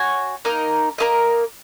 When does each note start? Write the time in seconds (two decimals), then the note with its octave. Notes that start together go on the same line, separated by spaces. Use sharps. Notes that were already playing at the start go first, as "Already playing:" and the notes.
Already playing: F#4 C#5 G#5
0.45 A#3 D#4 A#4 D#5
0.98 A#3 D#4 A#4 D#5